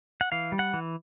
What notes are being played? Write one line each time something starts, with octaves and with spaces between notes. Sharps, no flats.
F#5
E3 F5
G3
F#5
E3